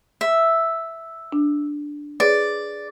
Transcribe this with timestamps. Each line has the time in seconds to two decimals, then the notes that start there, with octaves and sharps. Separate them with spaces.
0.21 E5
1.32 D4
2.20 G#4 B4 C#5 D5